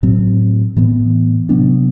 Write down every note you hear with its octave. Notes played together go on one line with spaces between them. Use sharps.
A2 F#3 C4
A2 E3 B3
C3 F#3 B3 D4